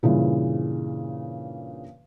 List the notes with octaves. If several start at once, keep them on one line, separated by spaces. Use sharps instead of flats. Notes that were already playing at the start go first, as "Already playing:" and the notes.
G2 A#2 C#3 E3